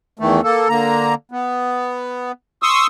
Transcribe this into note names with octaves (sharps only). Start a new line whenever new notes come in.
E2 D#3 E3 A3
A#3 A4
D3 A#3 A#5
B3
C6 C#6 D#6 E6